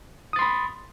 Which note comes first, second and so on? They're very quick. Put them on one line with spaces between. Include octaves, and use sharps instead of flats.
D#6 A6 C6 B5